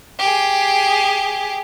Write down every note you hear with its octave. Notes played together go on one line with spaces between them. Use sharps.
G4 G#4